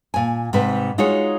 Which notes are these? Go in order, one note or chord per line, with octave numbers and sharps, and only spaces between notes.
A#2 G#5
G#2 C3 B4
G#3 D#4 F4 F#4 G#4 C#5